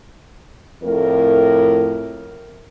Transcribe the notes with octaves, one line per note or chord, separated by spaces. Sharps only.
F2 A2 A#4